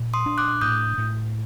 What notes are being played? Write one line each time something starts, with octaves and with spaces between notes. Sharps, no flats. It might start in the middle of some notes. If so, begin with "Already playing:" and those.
Already playing: A#2
C6 D#6
D4
D6 F#6
A2 D#6 G6
A2